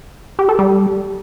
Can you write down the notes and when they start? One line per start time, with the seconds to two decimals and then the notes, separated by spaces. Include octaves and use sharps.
0.39 G4
0.49 A4
0.59 G3